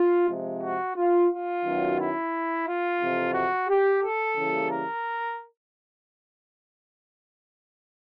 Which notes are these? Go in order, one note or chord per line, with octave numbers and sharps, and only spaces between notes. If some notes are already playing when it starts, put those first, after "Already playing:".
Already playing: F4
C3 F3 G#3
F#4
F4
F4
F#2 D#3 F#3 B3
E4
F4
F2 C3 E3
F#4
G4
A4
C#3 E3 G3 A#3
A#4